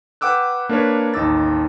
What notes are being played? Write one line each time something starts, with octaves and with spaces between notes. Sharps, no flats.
B4 F#5 G5 D6 E6 F#6
A#3 D4 A#4 B4 C#5
A1 D#2 D#4 D6 E6 A6